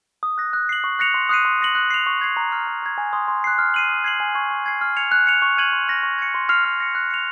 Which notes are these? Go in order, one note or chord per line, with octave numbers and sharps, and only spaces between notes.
D#6
F#6 A#6
F#6
C7 F#7
C#6
F#6 A#6 C#7 F7
C6
D#6 F#6 C7 D#7
C6
D#6 A#6 C#7 F#7
F#6
C7 F7
C#6
G#6 C7
A#5
F6 C7
A#5
C#6 G#6
G#5
C6 D#6
C6
F#6 C7
F6
C7 D#7 F#7
D#6
G#6 C7 F#7
G#5
C#6 G#6
C#6
G#6 C7
F6
G#6 C#7 F7
F#6
C#7 F7
C#6
F6 G#6 D#7 F#7
C6
F6 A#6
C#6
G#6 C#7
C6
F6 C7 F7
F6
A#6 C#7
F#6
C#7 F7